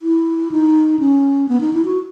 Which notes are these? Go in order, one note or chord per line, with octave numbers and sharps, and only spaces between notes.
E4
D#4
C#4
B3
D#4
E4
F#4